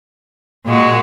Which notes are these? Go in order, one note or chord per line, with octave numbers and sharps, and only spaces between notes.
A#2 G#3 F#4